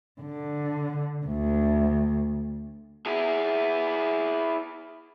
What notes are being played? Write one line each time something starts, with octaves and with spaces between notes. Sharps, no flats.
D3
D2
E4 G#4